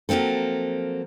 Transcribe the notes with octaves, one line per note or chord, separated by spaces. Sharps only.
F3 F#3 A#3 C4 A4